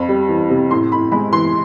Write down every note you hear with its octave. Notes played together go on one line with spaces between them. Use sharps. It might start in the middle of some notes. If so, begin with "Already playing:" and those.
Already playing: F2 B5
G3
E3
C3
A2 C6
A2 B5
G#3 B5
E3 C6